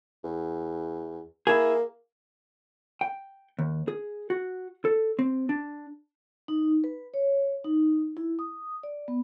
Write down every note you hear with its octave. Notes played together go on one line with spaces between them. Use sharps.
E2
A#3 E4 G#4
G5
D#2
G#4
F#4
A4
C4
D4
D#4
B4
C#5
D#4
E4
D#6
D5
B3